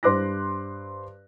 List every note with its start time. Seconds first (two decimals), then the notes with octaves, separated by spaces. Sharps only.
0.03 G2 C5 C6 D6 F#6 A#6